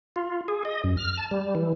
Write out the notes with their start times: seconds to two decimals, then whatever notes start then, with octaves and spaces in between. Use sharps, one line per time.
0.16 F4
0.48 G#4
0.65 D#5
0.84 F#2
0.97 F6
1.17 A5
1.31 G3
1.55 E3